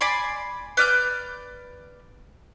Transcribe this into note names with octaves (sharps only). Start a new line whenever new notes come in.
D5 G#5 B5 C6
B4 D5 F6 G6